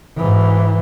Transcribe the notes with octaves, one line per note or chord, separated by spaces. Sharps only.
G#2 E3